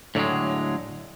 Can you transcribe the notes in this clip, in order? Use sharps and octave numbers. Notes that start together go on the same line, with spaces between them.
A2 D3 F#3 G#3